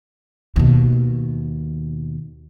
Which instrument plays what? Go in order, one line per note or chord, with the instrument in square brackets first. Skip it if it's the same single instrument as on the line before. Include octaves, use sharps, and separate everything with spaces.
[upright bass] D#2 B2